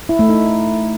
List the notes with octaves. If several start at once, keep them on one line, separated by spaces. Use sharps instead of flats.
E4
A3
D#4